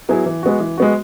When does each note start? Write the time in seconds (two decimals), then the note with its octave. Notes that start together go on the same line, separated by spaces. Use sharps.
0.09 F#3 B3 E4 G#4
0.26 E3
0.43 G#3 B3 F#4
0.60 E3
0.78 G#3 B3 F#4